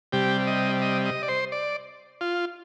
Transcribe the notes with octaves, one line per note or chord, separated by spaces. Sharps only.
C3 G3 G4
D#5
D#5
D#5
D5
C5
D5
F4